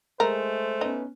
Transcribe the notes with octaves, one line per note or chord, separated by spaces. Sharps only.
G#3 A3 A#4 C5
B3 C#4 D#4